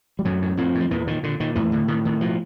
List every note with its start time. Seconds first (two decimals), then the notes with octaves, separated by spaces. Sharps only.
0.19 G3
0.25 F#2 A2 F#3
0.42 A2
0.57 F2 A2 F3
0.75 A2
0.80 F3
0.91 E2 A#2 E3
1.07 A#2 D#3
1.23 A#2 D3
1.40 A#2 D#3
1.55 E2 A2 E3
1.72 A2 D3
1.88 A2 D#3
2.05 A2 D#3
2.21 B2 F3